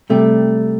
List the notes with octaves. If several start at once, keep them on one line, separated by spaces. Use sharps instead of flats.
C3 G3 A3